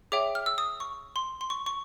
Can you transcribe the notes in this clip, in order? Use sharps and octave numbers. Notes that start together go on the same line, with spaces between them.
G#4 C#5 E5 G5 D6
F6
E6
D#6
C#6
C6
C6
C#6
C#6